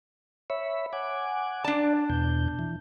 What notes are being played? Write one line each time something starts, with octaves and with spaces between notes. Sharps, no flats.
C#5 E5 B5
F#5 G#5 D6
D4 D5 A5
E2 B2 G6
E3